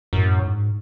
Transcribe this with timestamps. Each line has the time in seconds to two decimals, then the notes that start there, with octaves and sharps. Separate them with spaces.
0.13 F#2 A2
0.42 G#2